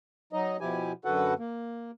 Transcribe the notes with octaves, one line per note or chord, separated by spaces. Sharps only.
F#3 D#4 D#5
B2 F3 E4 G4 G#5
F#2 D3 F#4 A4 B4 F#5
A#3